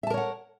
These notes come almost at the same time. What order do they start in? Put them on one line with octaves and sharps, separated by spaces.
E5 A5 A#4 C#5 F#5